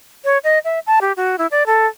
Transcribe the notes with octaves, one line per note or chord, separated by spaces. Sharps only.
C#5
D#5
E5
A5
G4
F#4
E4
D5
A4